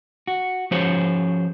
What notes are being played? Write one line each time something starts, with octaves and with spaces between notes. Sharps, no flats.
F#4
F3 C#4 F#4 G#4 C5 C#5